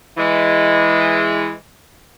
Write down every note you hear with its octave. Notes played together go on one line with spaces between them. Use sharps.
E3 G#3